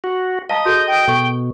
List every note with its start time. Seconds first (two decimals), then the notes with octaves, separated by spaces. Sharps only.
0.04 F#4
0.50 D#5 F5 A5 A#5
0.65 F#4 G#4 A4 G6
0.87 G5
1.07 B2 A4 C#6